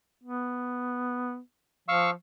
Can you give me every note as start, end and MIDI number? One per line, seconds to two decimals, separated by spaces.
0.24 1.39 59
1.88 2.11 53
1.88 2.10 77
1.88 2.10 85
1.88 2.10 88